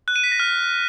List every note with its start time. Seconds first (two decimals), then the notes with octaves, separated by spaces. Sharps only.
0.08 F#6
0.16 D#7
0.24 B6
0.32 A#6
0.40 F6